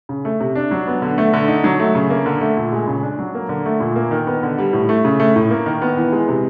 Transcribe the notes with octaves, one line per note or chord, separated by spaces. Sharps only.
C#3
A3
C3
D4
F#3
B3
D3
A3
D3
D#4
F#3
A3
C#3
A#3
D3
A3
A#2
G#3
C#3
D4
F#3
A#3
D3
A3
A#2
A#3
D#3
B3
D3
G3
A2
A3
C#3
A3
A2
A#3
D#3
B3
E3
G#3
C3